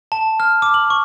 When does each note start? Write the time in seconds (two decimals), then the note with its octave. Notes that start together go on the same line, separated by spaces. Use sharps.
0.12 A5
0.40 F6
0.62 D6
0.74 F#7
0.90 C#6